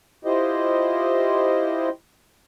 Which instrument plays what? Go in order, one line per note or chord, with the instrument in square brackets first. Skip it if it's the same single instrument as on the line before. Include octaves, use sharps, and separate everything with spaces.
[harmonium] E4 F4 G4 C5 D#5